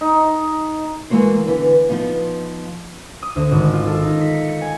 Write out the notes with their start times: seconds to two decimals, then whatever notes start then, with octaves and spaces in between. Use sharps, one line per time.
0.01 D#4
1.10 E3 G#3 A#3 F#4 C5
1.46 D3 E3 B3 E4 B4
1.89 F3 B3 D#4 F4
3.23 D#6
3.36 D2
3.51 G#1
3.74 F4
3.87 A4
4.02 D#4
4.21 B6
4.35 C#7
4.49 C#7
4.62 G#5